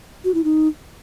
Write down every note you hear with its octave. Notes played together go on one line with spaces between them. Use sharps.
F#4
E4
D#4